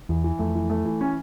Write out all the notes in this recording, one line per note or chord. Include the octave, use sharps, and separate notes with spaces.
E2 E3
E3
F2 A3
E3
A3
E3
C#4